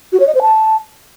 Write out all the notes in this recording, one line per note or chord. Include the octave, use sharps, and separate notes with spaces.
F#4
C#5
D#5
C5
A5